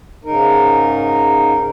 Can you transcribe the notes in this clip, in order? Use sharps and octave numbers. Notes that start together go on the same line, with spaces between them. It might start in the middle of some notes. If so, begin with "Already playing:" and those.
G#2 C#3 D#4 A#4